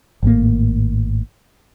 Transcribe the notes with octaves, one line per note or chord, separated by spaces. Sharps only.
G#1 A2 A#3